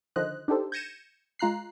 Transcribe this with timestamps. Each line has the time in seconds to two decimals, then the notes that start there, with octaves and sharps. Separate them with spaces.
0.16 D3 D#3 F3 C5 D#5 F#6
0.48 D4 D#4 G4 A4 C5
0.72 G6 G#6 A#6 C#7 D#7 E7
1.39 G#3 F4 A#5 F#6 C7